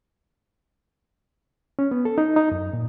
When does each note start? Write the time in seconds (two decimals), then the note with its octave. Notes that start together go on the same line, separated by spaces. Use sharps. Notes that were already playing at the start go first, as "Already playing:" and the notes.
1.79 C#4
1.91 B3
2.05 A4
2.18 D#4
2.36 D#4
2.52 F#2
2.73 A#2